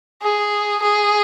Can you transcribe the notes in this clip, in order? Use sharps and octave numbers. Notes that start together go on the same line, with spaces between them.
G#4
G#4